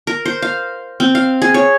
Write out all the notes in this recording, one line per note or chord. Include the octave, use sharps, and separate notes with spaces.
A#4
C5
F5
C4
F5
G#4
C#5